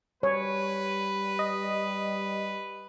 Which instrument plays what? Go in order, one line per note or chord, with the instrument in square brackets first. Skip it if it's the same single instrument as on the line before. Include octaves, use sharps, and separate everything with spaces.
[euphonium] G3 [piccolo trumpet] B4 [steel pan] C#5
[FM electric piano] D#5